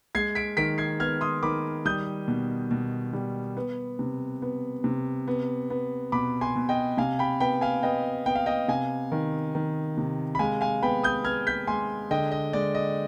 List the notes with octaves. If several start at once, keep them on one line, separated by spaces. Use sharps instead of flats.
G#3 G#6 C7
B6 D7
D#3 B6 D7
G#6 C7
B3 F6 G#6
C6 D#6
D#3 B5 D6
G3 D#6 G6
B2
B2
G3
B3
C3
B3
C3
B3
B3
B2 B5 D6
G#5 C6
B2
D#5 G5
C3 F5 G#5
G5 B5
B3 G5 B5
F5 G#5
B3 D#5 G5
B3 G5
F5
D#5 G5
C3 F5 G#5
D#3
D#3
C3
B5
G#3 F5 G#5
F5 G#5
B3 G5 B5
D#6 G6
B3 F6 G#6
G6 B6
G#3 G#5 C6
D3 D#5 G5
D#5
G#3 D5
D#5